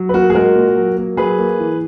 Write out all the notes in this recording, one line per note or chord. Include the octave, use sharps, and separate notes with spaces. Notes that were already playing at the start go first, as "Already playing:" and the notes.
Already playing: F#3
B4
A#3 F#4 A#4
G#4
G#3 F#4 A#4
A#2
F#3
A#3
F#3 G#4 B4
A#3
E3